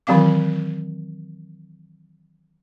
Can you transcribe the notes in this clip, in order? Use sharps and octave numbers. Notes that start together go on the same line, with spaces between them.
D#3 E3 F#3 C4 F5 D6